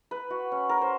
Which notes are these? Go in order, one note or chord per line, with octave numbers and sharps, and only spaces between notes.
B4
F#4
C#4
A#4
C5